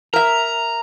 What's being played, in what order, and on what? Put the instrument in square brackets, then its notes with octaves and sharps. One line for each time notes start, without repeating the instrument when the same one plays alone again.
[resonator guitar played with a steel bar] A#4 E5 [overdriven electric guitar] A#5